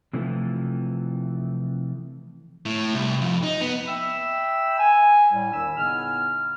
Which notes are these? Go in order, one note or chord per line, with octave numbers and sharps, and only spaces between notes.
C3 E3 F3 A3
A2
C2
F2
D#4
B3
E5 G5 B5 E6
G#5
A2 G3
D#2 D#3 D4 B5 E6
A2 C#3 B3 D#4 G#5 F6